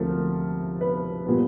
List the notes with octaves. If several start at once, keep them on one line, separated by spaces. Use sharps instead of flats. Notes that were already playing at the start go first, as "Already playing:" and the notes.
Already playing: D2 C3 F3 A3 A#4
B4
A#2 G3 B3